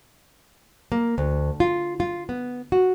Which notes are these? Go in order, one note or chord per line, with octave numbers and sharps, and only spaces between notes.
A#3
D2
F4
F4
B3
F#4